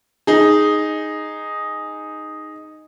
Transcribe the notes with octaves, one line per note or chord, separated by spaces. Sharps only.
D#4 G#4